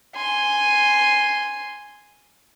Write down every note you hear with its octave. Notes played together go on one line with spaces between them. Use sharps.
G#5 C6